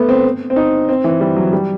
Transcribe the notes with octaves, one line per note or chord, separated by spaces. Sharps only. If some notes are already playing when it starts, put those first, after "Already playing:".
Already playing: A3 B3
C4
C4
D#4
C4
E3
G3
F#3
G3